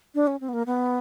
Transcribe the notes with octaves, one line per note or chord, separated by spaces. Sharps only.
D4
C#4
C4
B3
A#3
B3